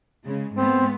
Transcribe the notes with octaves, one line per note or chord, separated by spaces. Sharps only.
C#3 G#3
G#2 A3 B3 C4